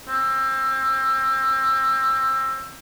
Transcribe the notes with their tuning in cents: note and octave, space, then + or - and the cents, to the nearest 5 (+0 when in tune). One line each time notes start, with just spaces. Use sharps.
C4 +30